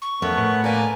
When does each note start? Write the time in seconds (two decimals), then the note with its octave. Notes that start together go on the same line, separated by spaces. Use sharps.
0.01 C#6
0.22 F2 A3 B3 C#4 A#4
0.38 A2
0.64 A#3 B4 D5 G#5